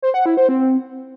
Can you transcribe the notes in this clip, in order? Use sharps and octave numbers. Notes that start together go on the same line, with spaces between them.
C5
F#5
E4
C5
C4